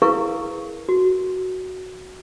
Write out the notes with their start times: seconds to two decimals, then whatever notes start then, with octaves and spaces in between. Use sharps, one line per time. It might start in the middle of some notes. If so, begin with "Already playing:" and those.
0.02 E4 G#4 A#4 B4 F5 C#6
0.89 F#4